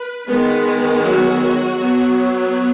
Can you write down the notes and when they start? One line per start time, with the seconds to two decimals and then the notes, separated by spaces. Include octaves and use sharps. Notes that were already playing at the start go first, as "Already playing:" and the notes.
Already playing: B4
0.26 D#3 G#3 B3
1.03 F#3 F#4
1.80 F#3 B3